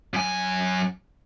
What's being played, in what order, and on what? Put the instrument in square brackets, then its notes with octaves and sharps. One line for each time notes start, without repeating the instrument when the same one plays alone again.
[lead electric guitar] F#2 G#5